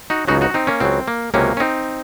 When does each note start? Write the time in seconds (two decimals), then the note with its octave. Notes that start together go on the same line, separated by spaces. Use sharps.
0.10 D#4 F#4
0.28 C#2 C#3 F#3 D#4 F#4
0.41 D#4 F#4
0.54 C4 D#4
0.67 A#3 C#4
0.80 C#2 C#3 F#3 C4
1.08 A#3
1.34 C#2 C3 F#3 A#3 C#4
1.57 C#4
1.60 C4 D#4